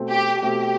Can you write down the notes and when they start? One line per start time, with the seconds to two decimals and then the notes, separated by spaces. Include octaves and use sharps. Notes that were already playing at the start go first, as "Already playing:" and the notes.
Already playing: B2 A3 C4
0.10 G4
0.41 B2 A3 C4 G4